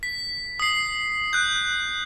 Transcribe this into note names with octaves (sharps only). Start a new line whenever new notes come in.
B6
D#6 C7
F#6 G6